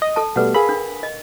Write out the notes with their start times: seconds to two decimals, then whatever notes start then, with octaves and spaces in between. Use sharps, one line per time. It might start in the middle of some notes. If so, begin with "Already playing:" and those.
0.02 D#5
0.16 A4 A5
0.36 B2 G3 A3 B4 F#5
0.54 G#4 A#4 F5 B5
0.69 D4
1.03 D#5